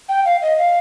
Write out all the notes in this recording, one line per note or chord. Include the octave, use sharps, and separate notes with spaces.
G5
F5
D#5
F5